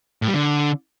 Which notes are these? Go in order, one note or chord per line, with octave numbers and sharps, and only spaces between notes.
A2
G3
D3